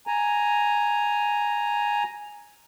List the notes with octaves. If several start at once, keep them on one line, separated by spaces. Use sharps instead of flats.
G#5 A#5